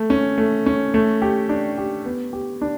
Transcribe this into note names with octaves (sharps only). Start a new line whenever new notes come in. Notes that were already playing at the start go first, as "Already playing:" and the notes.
Already playing: A3
C#4
A3
C#4
A3
G4
D4
G4
B3
G4
D4